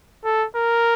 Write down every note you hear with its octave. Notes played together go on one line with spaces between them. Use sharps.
A4
A#4